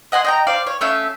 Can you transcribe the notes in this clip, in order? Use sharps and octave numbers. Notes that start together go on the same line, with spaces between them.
D#5 F#5 G#5 C6
D#5 G5 A#5
C5 D5 F5
C#5
A3 C#4 E5 F5